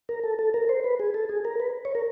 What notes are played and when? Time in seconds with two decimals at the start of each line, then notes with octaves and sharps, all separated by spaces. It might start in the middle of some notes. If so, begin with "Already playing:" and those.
0.09 A#4
0.24 A4
0.39 A4
0.54 A#4
0.69 C5
0.84 B4
1.00 G#4
1.14 A4
1.29 G#4
1.45 A#4
1.60 B4
1.85 C#5
1.95 A#4